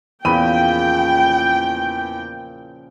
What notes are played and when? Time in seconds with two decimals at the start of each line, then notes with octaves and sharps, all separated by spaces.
0.25 E2 A#2 C#3 F3 G5 B5 D#7